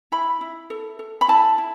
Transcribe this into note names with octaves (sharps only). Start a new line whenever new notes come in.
E4 B5
E4
A4
A4
B5
E4 A5
E4